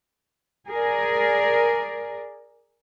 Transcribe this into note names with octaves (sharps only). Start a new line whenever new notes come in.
G#4 A#4 D5